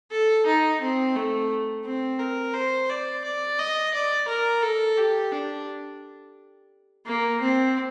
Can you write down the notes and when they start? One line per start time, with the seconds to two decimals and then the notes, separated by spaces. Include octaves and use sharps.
0.11 A4
0.46 D#4
0.81 C4
1.16 A3
1.85 C4
2.19 A#4
2.54 C5
2.90 D5
3.24 D5
3.59 D#5
3.94 D5
4.28 A#4
4.63 A4
4.98 G4
5.32 D4
7.06 A#3
7.41 C4